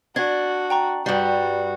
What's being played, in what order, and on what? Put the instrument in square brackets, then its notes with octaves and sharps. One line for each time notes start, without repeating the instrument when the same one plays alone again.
[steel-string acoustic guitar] D4 [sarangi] F#4 [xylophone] D5 G#6
[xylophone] G5 A#5 C#6
[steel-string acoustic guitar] G2 G3 [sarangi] F#4